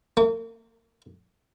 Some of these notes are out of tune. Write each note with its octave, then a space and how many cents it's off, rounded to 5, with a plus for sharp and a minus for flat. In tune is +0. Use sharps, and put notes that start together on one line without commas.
A#3 -40